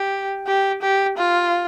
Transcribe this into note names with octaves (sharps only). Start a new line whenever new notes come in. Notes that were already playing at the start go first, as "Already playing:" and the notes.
Already playing: G4
G4
G4
F4